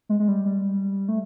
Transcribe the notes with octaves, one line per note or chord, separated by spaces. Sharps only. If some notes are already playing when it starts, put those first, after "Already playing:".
G#3
G#3
G3
G3
A3